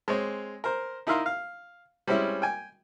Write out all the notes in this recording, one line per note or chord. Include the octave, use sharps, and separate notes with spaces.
G#3 C4 C#5
A#4 C5
D#4 E4 A#4 E5 F5 C6
F5
G3 G#3 C4 C#4 E4
G5 G#5